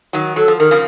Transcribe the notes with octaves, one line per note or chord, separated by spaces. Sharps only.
D#3 F#3
F#3 A4
F3
D#3 A#4
C#3 F3